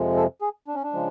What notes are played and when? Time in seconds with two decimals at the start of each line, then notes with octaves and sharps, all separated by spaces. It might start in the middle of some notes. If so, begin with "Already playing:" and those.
Already playing: F2 C3 F3 G#3
0.16 A4
0.41 G#4
0.68 D4
0.75 C#4
0.83 D4
0.93 C#3 F3 G#3